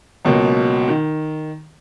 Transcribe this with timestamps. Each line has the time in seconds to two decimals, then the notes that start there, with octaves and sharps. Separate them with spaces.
0.25 C#2 B2 F#3 A#3
0.88 D#3